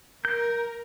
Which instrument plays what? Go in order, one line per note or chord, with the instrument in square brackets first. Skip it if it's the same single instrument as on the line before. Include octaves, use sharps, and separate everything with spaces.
[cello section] A#4 [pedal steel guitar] G6